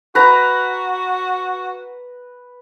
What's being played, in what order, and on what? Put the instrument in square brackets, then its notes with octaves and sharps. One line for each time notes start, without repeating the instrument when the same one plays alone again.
[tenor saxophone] F#4 [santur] B4 A#5